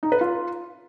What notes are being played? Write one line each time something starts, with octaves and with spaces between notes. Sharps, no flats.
D#4
B4
F4